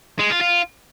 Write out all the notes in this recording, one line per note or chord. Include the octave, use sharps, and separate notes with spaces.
G#3
F4
F4